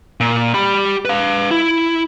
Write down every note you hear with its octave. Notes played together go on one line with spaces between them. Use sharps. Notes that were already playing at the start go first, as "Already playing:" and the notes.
A#2
G4 B5
B4 F5
E4